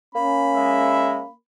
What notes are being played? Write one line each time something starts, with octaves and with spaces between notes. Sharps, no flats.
A#3 C#4 B5
G#3 E5